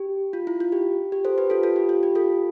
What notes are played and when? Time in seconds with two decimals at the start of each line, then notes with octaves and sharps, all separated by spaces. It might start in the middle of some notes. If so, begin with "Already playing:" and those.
Already playing: G4
0.33 F4
0.47 E4
0.60 F4
0.72 G4
1.12 G4
1.25 A4 C5
1.38 G4 B4
1.50 F4 A4
1.63 F4 A4
1.76 G4
1.89 F4
2.03 G4
2.15 F4 A4